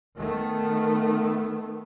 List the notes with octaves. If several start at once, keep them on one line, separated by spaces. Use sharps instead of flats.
D#3 A3 B3